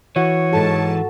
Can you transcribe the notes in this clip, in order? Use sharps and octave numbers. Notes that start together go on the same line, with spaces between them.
E3 F#4 C#5
G#2 A4 A5